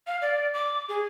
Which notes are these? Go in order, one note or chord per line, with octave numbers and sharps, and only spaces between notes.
F5
D5
D6
G#4